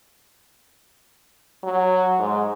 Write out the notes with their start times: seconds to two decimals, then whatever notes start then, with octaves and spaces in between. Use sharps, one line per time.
1.63 F#3
2.19 G#2